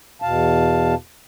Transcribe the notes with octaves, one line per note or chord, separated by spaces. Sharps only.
E2 B2 F5 A5